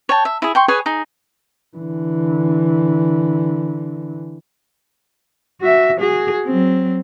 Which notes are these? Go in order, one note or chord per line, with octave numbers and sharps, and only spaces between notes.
C#5 G5 A5
E5
E4 G#4
G5 C6 C#6
G#4 B4 C#5 G#5
D#4 G#4
D3 E3
F#4 E5
F#4 G#4
F#3 C4